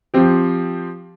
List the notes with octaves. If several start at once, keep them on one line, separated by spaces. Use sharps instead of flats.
F3 C4 G4